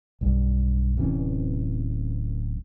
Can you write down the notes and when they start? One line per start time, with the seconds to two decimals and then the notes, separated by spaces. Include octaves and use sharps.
0.21 B1 G2
0.97 D1 C3 E3 C#4